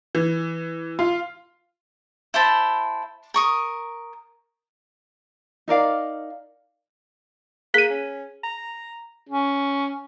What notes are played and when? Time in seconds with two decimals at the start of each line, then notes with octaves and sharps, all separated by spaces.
0.15 E3
0.99 F4
2.34 E4 C5 A5 B5
3.34 A#4 C#6 D#6
5.68 D#4 A#4 D5 F5
7.74 A#3 G#4 B6 D#7
7.90 C#4
8.44 A#5
9.29 C#4